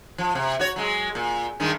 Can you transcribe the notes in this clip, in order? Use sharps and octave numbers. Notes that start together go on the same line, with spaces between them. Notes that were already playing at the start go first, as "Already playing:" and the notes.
F3
C3
F#4 C#5
F#3 G#3
A#2
G2 D#3 G#3